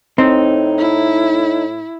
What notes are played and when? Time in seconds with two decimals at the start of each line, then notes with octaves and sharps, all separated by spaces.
0.18 A2 C4 D#4
0.78 E4